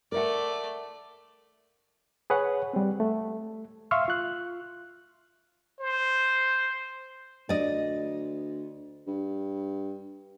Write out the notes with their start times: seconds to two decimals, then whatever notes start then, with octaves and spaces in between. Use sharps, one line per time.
0.12 A3 A#4 D5 E5 F#5
2.30 G#4 B4 C#5 F#5
2.73 G3 C4
3.00 A3
3.91 E5 F5 C6 C#6 E6 F6
4.08 F4 F#6
5.80 C5
7.49 D2 D5 D#5
9.07 G2